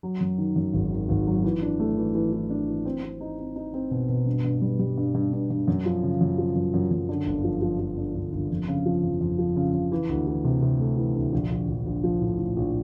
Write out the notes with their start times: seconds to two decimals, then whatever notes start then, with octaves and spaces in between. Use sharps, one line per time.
0.03 F#3
0.20 F#2
0.38 D#3
0.56 F#2
0.73 G#1
0.91 D#3
1.09 G#1
1.27 F#3
1.44 E3
1.62 D4
1.80 A3
1.97 E3
2.15 E3
2.33 E3
2.50 D4
2.68 E3
2.85 C4
3.03 C4
3.21 D#4
3.38 C4
3.56 D#4
3.74 C4
3.91 B2
4.09 B2
4.26 G2
4.44 G2
4.62 G3
4.79 G3
4.98 G2
5.15 G2
5.33 G2
5.50 G2
5.68 F#2
5.86 F3
6.03 C#3
6.21 F#2
6.38 F3
6.55 F#2
6.74 F#2
6.91 F#2
7.09 D3
7.26 G1
7.44 F3
7.62 F3
7.80 F3
7.97 D3
8.15 G1
8.33 G1
8.50 F2
8.68 C#3
8.86 F3
9.04 F2
9.21 F2
9.39 F3
9.56 C#3
9.74 C#3
9.92 E3
10.09 D2
10.27 E3
10.44 C3
10.62 C3
10.79 A3
10.97 E3
11.15 D2
11.32 A#1
11.50 A#1
11.68 A#1
11.86 A#1
12.04 F3
12.21 A2
12.38 A2
12.56 A#1